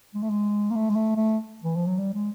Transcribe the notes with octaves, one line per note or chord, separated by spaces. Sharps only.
G#3
A3
G#3
A#3
A3
G#3
A3
A3
E3
F3
F#3
G3
G#3